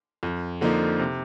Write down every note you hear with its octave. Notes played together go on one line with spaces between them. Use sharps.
F2
D3 F3 A#3 D#4
C3